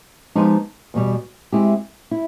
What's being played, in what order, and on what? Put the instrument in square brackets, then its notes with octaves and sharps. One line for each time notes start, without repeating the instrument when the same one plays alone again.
[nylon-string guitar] F3 G#3 B3 D#4 G4
E2 B2 G3
G#3 C4 E4 G4
E4